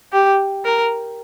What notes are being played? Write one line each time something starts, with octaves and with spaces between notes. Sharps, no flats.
G4
A#4